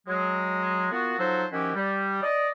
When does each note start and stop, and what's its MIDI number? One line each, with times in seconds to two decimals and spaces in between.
0.07 0.87 54
0.07 0.87 56
0.91 1.18 58
0.91 1.18 59
0.91 1.18 65
0.91 1.18 66
1.18 1.45 53
1.18 1.45 54
1.18 1.45 63
1.18 1.45 66
1.18 1.45 69
1.18 1.45 72
1.52 1.71 51
1.52 1.71 53
1.52 1.71 61
1.52 1.71 64
1.52 1.71 66
1.52 1.71 67
1.75 2.22 55
2.22 2.49 74
2.22 2.49 75